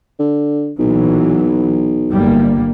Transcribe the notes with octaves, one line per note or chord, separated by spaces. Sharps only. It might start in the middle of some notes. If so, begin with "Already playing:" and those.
D3
B1 A#2 E3 F#3
G1 G3 A#3